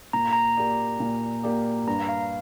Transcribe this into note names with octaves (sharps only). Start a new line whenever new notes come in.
A#2 A#5
A#5
A#3 G4 A#4 D5
A#2
A#3 G4 A#4 D5
G2 A#5
F5